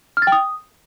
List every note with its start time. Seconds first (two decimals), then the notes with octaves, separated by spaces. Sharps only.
0.17 F6
0.22 A6
0.27 G5
0.32 D#6